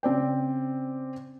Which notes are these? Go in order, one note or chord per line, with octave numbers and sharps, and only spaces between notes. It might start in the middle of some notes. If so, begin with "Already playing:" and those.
C#3 C4 D5 G5